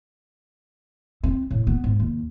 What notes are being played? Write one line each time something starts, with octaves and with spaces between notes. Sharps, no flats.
C4
A2
B3
G#2
D#2